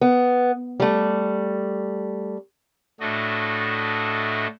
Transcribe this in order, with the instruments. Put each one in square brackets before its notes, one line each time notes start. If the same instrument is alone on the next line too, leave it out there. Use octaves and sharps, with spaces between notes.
[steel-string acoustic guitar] B3
G3 A3
[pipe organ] A2 A3 D4 F#4 D#5